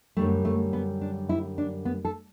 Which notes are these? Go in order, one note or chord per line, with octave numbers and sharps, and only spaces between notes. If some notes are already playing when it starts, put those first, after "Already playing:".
F#2 D3 G3 A3
A3
B3
D4
E4
D4
B3
A4